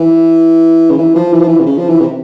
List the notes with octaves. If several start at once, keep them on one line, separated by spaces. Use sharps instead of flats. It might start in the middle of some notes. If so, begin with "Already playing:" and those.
Already playing: E3
C#3
E3
F3
E3
F3
E3
C3
C#3
F3
E3
C3